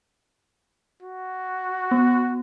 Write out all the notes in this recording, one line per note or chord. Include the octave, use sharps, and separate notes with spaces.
F#4
B3